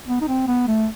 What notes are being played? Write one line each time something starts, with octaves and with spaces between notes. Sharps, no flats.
B3
D#4
C4
B3
A3